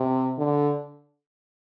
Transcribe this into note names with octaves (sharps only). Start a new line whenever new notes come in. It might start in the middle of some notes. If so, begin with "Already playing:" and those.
Already playing: C3
D3